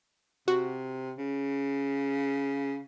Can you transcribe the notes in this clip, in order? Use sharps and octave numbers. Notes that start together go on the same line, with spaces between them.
C3 F#4
C#3